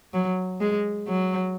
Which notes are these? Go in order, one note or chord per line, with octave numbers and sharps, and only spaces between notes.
F#3
G#3
F#3